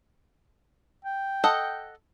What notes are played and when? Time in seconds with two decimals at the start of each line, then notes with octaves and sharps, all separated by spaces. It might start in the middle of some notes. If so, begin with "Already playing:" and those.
1.05 G5
1.44 A4 D#5 F#5